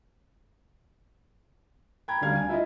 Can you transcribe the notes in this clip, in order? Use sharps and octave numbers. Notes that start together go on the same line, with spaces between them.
G5 A#5 B5 G#6
D2 G3 D4 F5 G#6
G#5
E4 F4 D#5